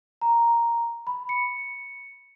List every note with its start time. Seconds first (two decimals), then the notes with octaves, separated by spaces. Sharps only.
0.21 A#5
1.07 B5
1.29 C#7